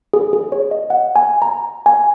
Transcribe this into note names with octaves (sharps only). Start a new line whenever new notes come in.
G#4
G#4
C#5
D#5
F#5
G#5
A#5
G#5